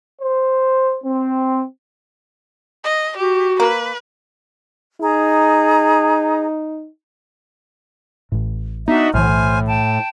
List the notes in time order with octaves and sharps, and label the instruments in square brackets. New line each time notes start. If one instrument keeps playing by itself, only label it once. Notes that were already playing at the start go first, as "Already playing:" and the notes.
[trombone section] C5
C4
[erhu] D#5
[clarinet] F#4 [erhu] G4
[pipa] A#3 [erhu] B4
[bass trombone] D#4 [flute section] G#4 A#5
[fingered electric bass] A1 A2
[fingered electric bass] B3 [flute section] D4 F#4 E5 [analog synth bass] D#4
[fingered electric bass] B1 E3 [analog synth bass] A2 [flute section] C5 G#5 F6
[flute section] G5 A5